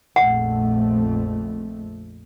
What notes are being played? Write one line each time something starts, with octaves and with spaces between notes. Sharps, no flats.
A#1 F2 A3 F#5